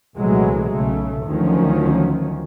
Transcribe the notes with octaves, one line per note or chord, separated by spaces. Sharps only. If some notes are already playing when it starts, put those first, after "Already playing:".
C2 A#2 E3 F#3 G#3 A3
B1 C#3 A3
D2 D#3 F3 F#3 C#4